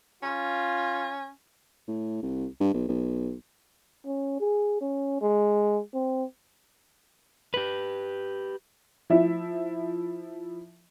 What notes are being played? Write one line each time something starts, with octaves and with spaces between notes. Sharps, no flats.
C#4 F4
A2
C2
G2
B1
B1
C#4
G#4
C#4
G#3
C4
G4 B4
F3 E4 E5